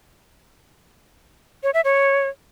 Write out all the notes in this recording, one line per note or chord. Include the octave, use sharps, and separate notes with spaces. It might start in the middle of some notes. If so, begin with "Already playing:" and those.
C#5
E5
C#5